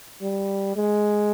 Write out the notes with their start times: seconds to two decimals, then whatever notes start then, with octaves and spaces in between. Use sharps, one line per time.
0.22 G3
0.76 G#3